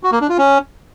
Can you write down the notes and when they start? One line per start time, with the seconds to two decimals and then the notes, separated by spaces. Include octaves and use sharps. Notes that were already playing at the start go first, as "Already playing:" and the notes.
0.03 F#4
0.12 A#3
0.21 D4
0.29 F4
0.38 C#4